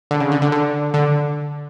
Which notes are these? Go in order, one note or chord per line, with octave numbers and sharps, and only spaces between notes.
D3
C#3
D3
D3
D3
D3